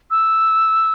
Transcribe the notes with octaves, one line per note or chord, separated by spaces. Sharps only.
E6